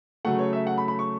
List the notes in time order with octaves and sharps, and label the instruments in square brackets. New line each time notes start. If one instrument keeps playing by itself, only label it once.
[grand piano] C#3 F#3 A3 F#5
C#5
E5
F#5
B5
B5
C#6